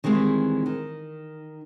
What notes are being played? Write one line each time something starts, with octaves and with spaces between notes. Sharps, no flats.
D#3 E3 G3 G#3 C4
D#3